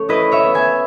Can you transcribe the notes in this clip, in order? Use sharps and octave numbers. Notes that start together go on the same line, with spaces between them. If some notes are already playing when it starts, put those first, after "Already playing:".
Already playing: A3 C#4 C#5
E4 B4 D#5
C#5 E5
B3
E5 G#5